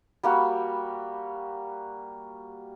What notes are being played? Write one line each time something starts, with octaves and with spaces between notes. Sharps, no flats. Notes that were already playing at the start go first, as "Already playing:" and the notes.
G3 A#3 F#4